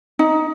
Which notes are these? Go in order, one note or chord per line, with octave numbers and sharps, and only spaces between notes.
D#4